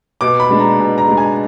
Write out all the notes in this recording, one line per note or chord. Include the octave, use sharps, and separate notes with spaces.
B2 D6
B5
G#3 D4
A#5
B2
A#5
G#3 D4
G#5